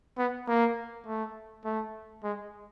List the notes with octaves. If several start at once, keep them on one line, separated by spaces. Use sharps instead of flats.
B3
A#3
A3
A3
G#3